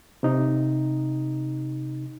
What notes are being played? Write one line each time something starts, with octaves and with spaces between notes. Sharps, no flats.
C3 D#4